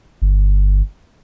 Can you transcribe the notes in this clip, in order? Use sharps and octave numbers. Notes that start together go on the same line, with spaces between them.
G1